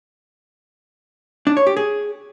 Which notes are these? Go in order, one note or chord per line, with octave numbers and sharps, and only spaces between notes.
D4
C#5
G4
G#4